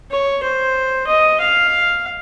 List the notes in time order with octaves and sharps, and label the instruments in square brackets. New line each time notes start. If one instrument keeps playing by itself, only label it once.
[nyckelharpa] C#5
C5
D#5
F5